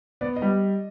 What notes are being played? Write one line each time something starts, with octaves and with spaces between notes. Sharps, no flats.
B3 D5
D#5
G3